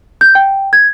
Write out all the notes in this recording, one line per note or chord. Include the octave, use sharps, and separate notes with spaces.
G6
G5
G#6